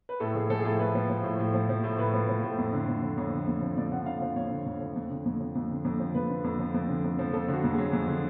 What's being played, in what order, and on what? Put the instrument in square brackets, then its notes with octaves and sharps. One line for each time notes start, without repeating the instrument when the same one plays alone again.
[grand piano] B4
A2 A4
F3 G#4
F3 A4
G#4
A2 A4
A2 B4
F3
F3
A2
A2
F3
F3
A2
A2 B4
F3
F3
A2
F2
D3
F2
F3
F2 C#5
D3
F2
F3
F2 D5
D3 F#5
F2 F5
F3 D5
F2 C#5
D3
F2
F3
F2
D3
F2
F3
F2
D3
F2
F3
F2 B4
D3
F2
F3
F2
D3
F2
F3
F2 A4
D3
F#4
F2
F#3 G#4
F2
D3